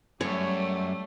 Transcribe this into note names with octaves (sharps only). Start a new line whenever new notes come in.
F#2 G3 A3 C#5